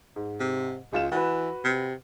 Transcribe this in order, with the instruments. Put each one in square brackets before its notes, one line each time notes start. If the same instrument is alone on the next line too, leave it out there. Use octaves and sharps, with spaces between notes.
[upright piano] G#2
[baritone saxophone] C3
[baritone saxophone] C#2 [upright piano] G#3 F4 E7
[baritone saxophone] E3 [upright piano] F#4 B4
[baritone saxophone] C3